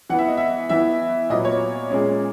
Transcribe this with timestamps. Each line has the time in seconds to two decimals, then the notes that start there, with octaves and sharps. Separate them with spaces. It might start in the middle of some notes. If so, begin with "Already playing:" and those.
0.10 E3 B3 F#5
0.19 E5
0.28 D#5
0.37 E5
0.70 E3 B3 E5
1.30 A#2 F#3 B3 D#5
1.45 C#5
1.90 A#2 G#3 C#4